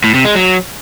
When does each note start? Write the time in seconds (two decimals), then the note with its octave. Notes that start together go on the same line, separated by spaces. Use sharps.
0.04 A2
0.14 C3
0.25 G#3
0.35 F#3